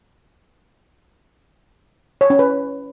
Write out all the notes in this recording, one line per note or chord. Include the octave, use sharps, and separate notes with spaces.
C#5
C#4
B4